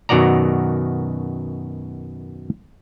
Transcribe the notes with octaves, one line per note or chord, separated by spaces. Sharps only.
F#2 B2 D#3 F#4 D5 A#5